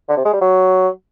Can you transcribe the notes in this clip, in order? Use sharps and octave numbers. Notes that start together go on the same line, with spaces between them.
D3
C3
G#3
G3
F#3